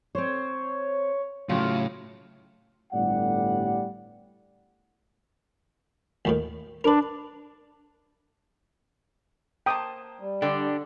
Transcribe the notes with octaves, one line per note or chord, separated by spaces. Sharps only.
C4 C5 C#5
A2 C#3 F#3 F4
G1 A2 G3 D5 F#5
D#2 A2 D#3
D4 A#4 B4
A#3 C5 G5 A5 D#6
G3
D3 D4 G4